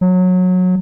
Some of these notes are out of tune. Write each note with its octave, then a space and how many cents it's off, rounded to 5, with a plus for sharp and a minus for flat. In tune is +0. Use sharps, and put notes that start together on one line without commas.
F#3 -20